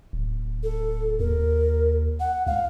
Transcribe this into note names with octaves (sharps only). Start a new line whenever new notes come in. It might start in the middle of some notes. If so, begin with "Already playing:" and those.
D1
A4
D#2 A#4
F#5
C#2 F5